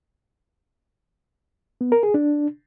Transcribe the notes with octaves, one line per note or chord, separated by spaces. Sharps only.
B3
A#4
G#4
D4